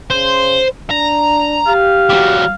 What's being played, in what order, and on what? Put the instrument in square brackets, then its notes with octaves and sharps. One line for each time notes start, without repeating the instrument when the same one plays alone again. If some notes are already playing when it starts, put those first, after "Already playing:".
[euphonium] C#3 [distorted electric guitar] C5
[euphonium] D4 [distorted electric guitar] A#5
[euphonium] G4 [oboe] F5
[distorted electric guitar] G3 F#4